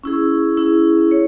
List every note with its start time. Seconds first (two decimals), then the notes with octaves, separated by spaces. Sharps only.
0.04 C#4 E4 G#4
0.57 C#4 E4 G#4
1.11 C#5